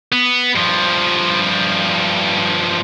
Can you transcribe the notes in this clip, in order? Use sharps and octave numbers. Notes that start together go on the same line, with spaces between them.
B3
G2 F3